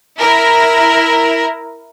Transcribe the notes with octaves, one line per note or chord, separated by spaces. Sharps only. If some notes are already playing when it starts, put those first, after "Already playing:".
E4 A#4